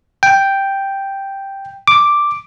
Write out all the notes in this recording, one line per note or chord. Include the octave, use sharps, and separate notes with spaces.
G5
D6